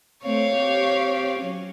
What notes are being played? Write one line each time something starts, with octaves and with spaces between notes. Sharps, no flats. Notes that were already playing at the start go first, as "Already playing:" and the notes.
A3 C4 C#5 F5
C4 G4
F#3 C#4